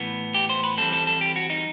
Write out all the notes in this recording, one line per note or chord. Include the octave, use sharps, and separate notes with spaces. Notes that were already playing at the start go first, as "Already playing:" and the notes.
Already playing: A2 E3 B3
G4
C5
B4
E3 G3 C4 A4
A4
A4
G4
F#4
D#4